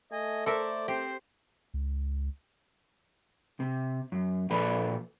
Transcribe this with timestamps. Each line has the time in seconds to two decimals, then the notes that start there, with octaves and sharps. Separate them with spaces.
0.12 A3 D#5 G#5
0.46 A4 A#4 C5 D5 E5
0.88 C4 G4 C5
1.74 C#2
3.60 C3
4.12 F#2
4.51 A#2 F3 A4 B4 D5 B5